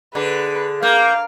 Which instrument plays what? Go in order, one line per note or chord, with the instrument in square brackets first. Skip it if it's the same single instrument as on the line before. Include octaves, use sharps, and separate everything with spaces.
[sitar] D3 [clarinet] G#4 [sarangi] B4
[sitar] A#3 [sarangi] F5 [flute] G6